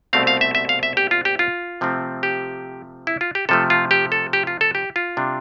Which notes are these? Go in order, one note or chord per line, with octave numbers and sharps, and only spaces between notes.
C2 B2 A3 C4 F5
F5
E5
E5
F5
E5
G4
F4
G4
F4
C3 F3 A3 C4
G4
E4
F4
G4
C3 F3 A3 A4
F4
G4
A4
G4
F4
A4
G4
F4
C3 G3 D4